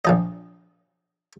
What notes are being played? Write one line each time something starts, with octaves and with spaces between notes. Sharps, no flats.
A#1 F3 D#5